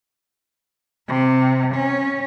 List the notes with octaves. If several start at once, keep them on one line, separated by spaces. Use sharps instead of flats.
C3
C#4